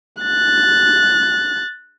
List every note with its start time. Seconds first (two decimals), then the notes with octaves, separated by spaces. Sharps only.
0.21 F#6 A6